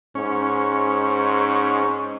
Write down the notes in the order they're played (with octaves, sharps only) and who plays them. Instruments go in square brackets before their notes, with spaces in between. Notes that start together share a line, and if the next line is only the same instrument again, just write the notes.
[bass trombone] G#2 [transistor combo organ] C#4